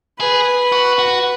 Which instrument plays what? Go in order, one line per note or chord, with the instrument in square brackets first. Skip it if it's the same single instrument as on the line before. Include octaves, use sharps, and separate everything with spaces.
[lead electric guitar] G#4 [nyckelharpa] B4
[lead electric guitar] F#4
F#4